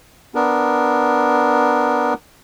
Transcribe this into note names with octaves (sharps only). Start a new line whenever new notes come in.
B3 D4 A#4